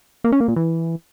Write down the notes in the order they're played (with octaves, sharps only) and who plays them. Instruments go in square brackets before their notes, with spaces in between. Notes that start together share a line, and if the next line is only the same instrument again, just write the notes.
[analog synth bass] A#3
C#4
A#3
A#2
E3